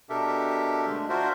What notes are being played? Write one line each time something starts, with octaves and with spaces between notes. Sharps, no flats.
B2 D4 G4 A4 A#4 E5
D3 G#3 A3 D4
D4 F4 F#4 A#4 C5 E5